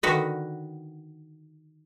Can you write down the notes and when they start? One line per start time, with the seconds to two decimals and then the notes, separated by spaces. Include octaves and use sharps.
0.03 D3 D#3 F#4 B4 D#5